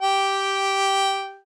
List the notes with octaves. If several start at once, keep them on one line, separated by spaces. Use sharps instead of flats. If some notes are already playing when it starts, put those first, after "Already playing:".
G4 G5